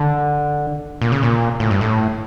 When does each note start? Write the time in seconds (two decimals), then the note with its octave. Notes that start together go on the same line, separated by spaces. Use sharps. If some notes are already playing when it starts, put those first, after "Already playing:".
Already playing: D3
1.02 A#2
1.12 C#3
1.23 A#2
1.60 A2
1.71 G2
1.81 A2